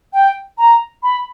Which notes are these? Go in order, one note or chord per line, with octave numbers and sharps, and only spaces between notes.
G5
A#5
B5